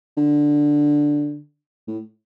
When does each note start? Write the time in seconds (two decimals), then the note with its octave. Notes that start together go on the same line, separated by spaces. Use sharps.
0.17 D3
1.88 A2